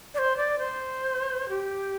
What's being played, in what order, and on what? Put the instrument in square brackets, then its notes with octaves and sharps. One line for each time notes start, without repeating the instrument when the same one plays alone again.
[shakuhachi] D5
C5
D5
C5
G4